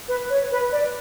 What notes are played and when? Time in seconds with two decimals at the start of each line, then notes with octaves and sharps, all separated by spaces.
0.08 B4
0.30 C#5
0.51 B4
0.72 D5